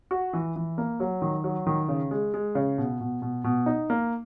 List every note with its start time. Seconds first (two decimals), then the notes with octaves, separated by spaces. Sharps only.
0.11 F#4
0.33 E3
0.56 E3
0.78 A#3
1.00 F#3
1.22 D#3
1.44 F#3
1.67 D#3
1.88 C#3
2.11 G#3
2.34 G#3
2.55 C#3
2.78 B2
3.01 B2
3.22 B2
3.44 B2
3.66 D#4
3.90 A#3